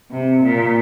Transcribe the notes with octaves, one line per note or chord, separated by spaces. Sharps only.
C3
A#2